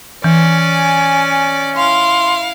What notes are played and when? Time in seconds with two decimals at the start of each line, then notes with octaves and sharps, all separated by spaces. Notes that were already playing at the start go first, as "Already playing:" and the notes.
0.24 E3 C#4 D5
0.58 G#5
1.76 E4 F5 C6